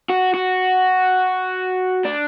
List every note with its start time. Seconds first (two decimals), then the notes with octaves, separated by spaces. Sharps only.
0.10 F#4
0.34 F#4
2.05 D4